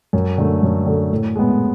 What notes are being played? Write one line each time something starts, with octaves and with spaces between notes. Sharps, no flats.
F#2
D3 A3
F#2
D3 A3
A2
G#3 B3